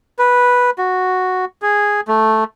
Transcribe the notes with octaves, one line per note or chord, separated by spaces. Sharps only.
B4
F#4
G#4
A3